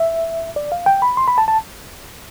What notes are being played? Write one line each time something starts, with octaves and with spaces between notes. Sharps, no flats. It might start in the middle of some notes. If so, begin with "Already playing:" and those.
Already playing: E5
D5
F5
G5
B5
C6
B5
A5
A5